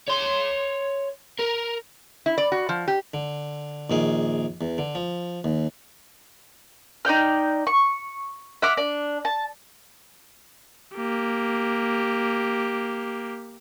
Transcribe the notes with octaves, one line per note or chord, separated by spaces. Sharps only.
C#5 C6
A#4
E4
D5
F#4
F3
G4
D3
A#1 D#3 G#4
E2
D3
F3
D#2
D#4 D5 G5 F6
C#6
E5 F#5 D6 F6
D4
A5
A#3 G4